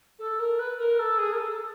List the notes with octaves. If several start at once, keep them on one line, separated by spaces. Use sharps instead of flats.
A4
A#4
B4
A#4
A4
G#4
A#4
A4